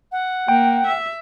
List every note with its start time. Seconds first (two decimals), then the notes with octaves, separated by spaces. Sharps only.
0.12 F#5
0.48 A#3 G5
0.87 E5